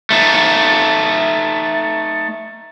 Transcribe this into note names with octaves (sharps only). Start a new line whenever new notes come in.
A3 D#4